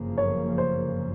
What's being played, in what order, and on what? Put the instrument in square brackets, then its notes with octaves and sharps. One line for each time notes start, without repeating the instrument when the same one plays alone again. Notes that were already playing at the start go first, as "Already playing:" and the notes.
Already playing: [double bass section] G1 F#2 C#3 F3 A#3
[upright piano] C#5
C5